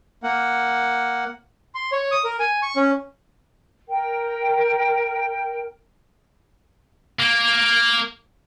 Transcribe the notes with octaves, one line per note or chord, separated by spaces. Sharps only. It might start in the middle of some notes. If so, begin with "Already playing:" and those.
A#3 F#5
C6
C#5
D#6
A#4
G#5
C#6
C#4
A#4 G5
A#3